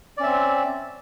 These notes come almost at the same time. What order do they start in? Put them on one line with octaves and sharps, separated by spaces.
D5 C#4 E5 C4